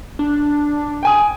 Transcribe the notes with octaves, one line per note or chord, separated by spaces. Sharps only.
D4
G5 G#5 D#6